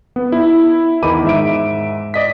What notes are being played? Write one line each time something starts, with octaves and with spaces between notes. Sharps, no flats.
B3
E4
E2 D#3 D#4 B5 D6 D#7
G#2 E5 D7
D5 D#5 B6